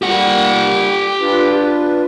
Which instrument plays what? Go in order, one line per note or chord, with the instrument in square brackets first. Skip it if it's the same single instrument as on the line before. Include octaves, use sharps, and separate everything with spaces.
[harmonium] G3 A#3 [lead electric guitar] G4 F#5
[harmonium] D4 F4 B4